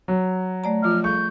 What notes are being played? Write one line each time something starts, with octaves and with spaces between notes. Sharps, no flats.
F#3
A3 D5 A#5
F3 F4 F6
G3 G#4 A4 C#6 G6